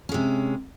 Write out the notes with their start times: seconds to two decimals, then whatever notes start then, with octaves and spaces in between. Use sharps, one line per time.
0.09 C#4
0.12 G#3
0.14 C3